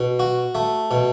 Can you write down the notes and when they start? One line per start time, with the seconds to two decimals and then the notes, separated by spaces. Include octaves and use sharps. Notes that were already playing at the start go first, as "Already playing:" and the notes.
Already playing: B2
0.19 F#4
0.55 A3
0.91 B2